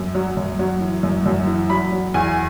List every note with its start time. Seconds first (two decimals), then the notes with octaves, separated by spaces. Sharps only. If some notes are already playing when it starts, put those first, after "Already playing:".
Already playing: F#2
0.15 F#3
0.37 F#2
0.59 F#3
0.81 E3
1.03 F#2
1.26 F#2
1.47 E3
1.70 F#3 B5
1.92 F#3
2.14 E2 G#5